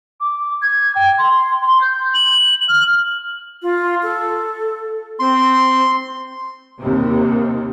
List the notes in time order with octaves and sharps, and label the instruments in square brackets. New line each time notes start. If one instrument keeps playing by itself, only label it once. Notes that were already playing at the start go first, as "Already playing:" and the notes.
[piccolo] D6
G#6
G5
C6
C6
G6
F#7
F6
[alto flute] F4
A4
[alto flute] C4 [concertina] C6
[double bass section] D#2 C3